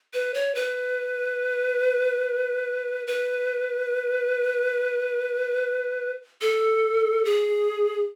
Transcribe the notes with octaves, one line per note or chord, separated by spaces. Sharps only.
B4
C#5
B4
B4
A4
G#4